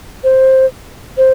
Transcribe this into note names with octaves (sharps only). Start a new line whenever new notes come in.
C5
C5